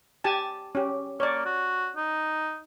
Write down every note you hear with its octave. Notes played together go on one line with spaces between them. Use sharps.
G4 G#5 A5
C#4 G4
A#3 C#5 D5
F#4
D#4